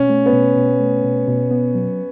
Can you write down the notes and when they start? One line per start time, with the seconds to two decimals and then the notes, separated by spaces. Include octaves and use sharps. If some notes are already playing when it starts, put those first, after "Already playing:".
Already playing: B2 C#4
0.10 A3
0.26 B3
0.33 B2
0.57 B2
0.80 A3
1.04 B2
1.28 B2
1.51 B3
1.75 F#3